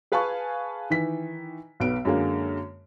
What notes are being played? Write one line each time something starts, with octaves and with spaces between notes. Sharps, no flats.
G#4 B4 F5 G#5 A5 C#6
D#3 E3 B6
B1 B3 D7
F#2 D3 G#3 A#3